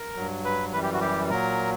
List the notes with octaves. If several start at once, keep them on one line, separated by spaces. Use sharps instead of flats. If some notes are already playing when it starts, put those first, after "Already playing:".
Already playing: A#4
G2 F#3
B4
F#2 E3 G3 B4
G4
F#4
G4
A#2 F#3 A#4